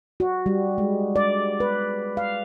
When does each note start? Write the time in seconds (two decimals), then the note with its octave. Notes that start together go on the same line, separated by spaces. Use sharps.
0.20 F#4
0.46 G3
0.78 G#3
1.16 D5
1.60 B4
2.17 F5